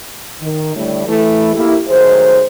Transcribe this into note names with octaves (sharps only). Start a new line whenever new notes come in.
D#3
A2 D3 G3 A3
E3 A3 E4
A#3 E4 G4
D#3 F#3 A3 G#4 C5